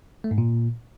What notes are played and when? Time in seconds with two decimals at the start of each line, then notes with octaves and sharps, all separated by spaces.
0.24 A3
0.31 G#2
0.38 A#2